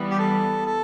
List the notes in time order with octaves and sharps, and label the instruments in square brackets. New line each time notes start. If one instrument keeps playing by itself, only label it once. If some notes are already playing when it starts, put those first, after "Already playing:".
Already playing: [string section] E3 G3 B3
[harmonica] G4
A4
A4